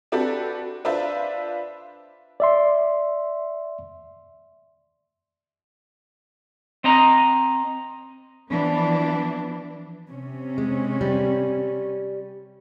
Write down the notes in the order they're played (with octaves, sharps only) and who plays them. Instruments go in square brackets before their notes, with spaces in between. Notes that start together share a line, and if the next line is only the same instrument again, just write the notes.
[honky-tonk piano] C4 D4 F#4 G4 A4 B4
D4 F4 B4 C5 E5
[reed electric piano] D5 E5 C6
[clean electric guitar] C4 D#5 A#5
[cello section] E3 F3 B3 D4
C3 C#4
[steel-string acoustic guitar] G#3
G3